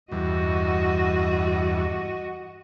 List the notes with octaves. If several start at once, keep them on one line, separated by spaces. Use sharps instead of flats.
E2 G2 F#4 D#5